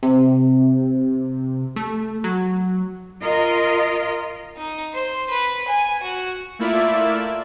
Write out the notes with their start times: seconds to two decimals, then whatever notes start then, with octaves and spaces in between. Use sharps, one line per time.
0.03 C3
1.76 A3
2.24 F#3
3.22 F4 A#4 D#5
4.57 D#4
4.93 C5
5.30 B4
5.68 G#5
6.02 F#4
6.59 A3 A#3 E4 F4 D5 E5